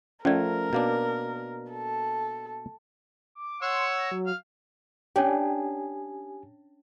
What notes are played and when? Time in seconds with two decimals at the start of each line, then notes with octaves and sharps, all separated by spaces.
0.25 F3 A3 C#4 A#4 D5
0.73 B2 A#3 D4
1.72 A4
3.35 D6
3.62 C#5 F#5 C6 E6
3.97 A#6
4.11 F#3
4.27 F5
5.16 C#4 D4 G4 C#5 G5 G#5